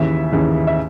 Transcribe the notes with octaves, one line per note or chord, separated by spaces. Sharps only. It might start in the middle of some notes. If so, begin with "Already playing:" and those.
Already playing: D#2 C#3 E3 E5
D#2 C#3 E3
E5